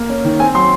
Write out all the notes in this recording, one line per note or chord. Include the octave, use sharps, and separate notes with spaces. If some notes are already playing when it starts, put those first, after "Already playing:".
Already playing: A#3
C#4
D#3
C4 G#5
F#3 C6